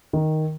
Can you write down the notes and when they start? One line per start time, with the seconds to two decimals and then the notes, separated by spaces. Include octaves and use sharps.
0.13 D#3